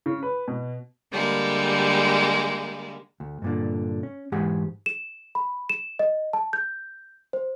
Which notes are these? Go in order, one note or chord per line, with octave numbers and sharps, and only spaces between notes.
C#3
B4
B2
D3 G3 G#3 A#3
D2
G2 A#2 D3
C#4
G#2 E3 G#3 G4 G#4 F#5
E7
B5
E7
D#5
A5
G6
C5